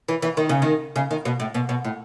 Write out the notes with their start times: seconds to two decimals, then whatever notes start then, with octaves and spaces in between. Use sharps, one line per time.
0.08 E3
0.22 E3
0.37 D#3
0.49 C#3
0.62 D#3
0.96 C#3
1.11 D#3
1.25 B2
1.40 A2
1.54 B2
1.69 B2
1.85 A2